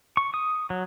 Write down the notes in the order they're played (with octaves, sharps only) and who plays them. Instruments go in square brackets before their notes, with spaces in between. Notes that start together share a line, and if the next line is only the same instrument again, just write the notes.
[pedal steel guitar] C#6
D#6
F#3